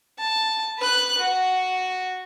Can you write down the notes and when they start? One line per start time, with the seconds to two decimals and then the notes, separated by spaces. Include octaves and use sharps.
0.18 A5
0.78 B4 F#6
1.18 F#4